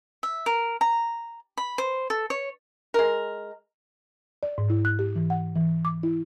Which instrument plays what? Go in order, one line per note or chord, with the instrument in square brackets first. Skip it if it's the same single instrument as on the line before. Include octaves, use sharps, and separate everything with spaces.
[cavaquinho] E5
A#4
A#5
B5
C5
A4
C#5
[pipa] G#3 A#4
[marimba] D5
G#2
E4
F#6
G4
E3
F#5
E3
D6
E4